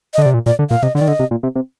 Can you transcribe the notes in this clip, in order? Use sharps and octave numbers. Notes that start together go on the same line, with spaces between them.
D#5
D3
D5
C3
A#2
A#2 D5
D3
A#2 F5
C3 D#5
D3 D5
D#3
D3 D#5
C3
A#2
C3
C3